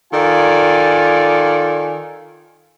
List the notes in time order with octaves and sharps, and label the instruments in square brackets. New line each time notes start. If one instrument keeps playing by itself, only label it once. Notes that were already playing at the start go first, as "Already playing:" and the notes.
[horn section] D#3 F4 A4 D5 G#5